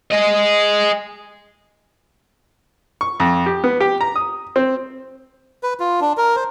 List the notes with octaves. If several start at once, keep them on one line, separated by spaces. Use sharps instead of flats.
G#4 D#5
C#6
F2
G4
B3
G4
A#5
D#6
C4
B4
F4
D4
A#4
C5